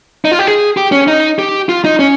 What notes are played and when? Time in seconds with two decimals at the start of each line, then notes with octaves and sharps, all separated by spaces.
0.25 D#4
0.32 F4
0.39 G4
0.47 G#4
0.77 G4
0.92 C#4
1.08 D#4
1.39 G4
1.69 F4
1.84 D#4
1.99 C#4